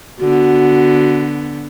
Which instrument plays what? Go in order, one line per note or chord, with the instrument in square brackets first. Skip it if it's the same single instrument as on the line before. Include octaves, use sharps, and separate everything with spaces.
[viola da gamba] D3 B3 [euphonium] F#4